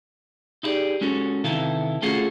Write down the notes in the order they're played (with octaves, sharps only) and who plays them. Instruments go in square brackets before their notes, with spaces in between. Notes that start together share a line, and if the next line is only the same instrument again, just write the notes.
[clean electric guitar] D#4 E4 G4 G#4 D5
G#3 C#4 F#4 A4
C3 D#3 E3 E4 A4 F5
A3 C#4 F4 F#4 G#4 A4